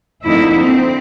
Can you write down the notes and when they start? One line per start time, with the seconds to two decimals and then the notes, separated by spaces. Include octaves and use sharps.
0.25 F2 D3 A#3 D#4 E4
0.59 C4